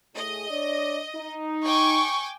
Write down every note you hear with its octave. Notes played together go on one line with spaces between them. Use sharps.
A2 G#4 D#5
D4 C#5 D5
D#4
G5 G#5 C#6 D6